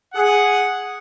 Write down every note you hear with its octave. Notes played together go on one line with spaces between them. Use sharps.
G#4 F#5